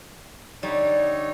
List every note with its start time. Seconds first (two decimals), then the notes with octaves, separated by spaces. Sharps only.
0.63 D3 G3 D#4 C#5